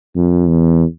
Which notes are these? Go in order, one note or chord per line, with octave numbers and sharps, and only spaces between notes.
F2
E2